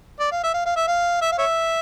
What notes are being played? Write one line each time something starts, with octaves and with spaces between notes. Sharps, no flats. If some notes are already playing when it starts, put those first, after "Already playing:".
D5
F5
E5
F5
F5
E5
F5
E5
F5
C#5 E5